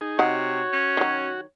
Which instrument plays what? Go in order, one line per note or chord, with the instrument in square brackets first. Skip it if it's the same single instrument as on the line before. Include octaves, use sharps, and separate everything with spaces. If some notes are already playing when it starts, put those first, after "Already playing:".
[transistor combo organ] D#4 G#4
[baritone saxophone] C3 [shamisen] D#4 F#5 [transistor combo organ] F#4 [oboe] C#5
[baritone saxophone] C#4
[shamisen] D#3 F#3